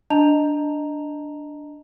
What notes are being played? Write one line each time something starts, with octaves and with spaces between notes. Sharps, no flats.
D4 D#5 A5 A#5 F7